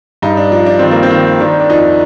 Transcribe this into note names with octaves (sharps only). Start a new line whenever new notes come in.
G2 D#4
D4
F3 D4
D4
D#3 C4
A#3
C4
D#3
D#3 D4
D4
F2 D#4